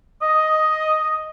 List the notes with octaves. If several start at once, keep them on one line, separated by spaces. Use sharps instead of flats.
D#5